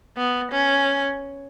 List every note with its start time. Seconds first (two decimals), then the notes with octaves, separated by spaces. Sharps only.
0.17 B3
0.52 C#4